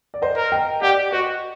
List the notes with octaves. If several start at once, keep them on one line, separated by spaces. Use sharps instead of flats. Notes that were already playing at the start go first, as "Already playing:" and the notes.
D5
C5 D#5
A#4
D#5 G5
G4 D5 F#5
F#4 C5 D#5